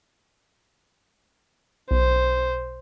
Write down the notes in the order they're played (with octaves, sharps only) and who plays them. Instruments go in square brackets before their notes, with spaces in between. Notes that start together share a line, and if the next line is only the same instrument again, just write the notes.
[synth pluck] B1 [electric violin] C5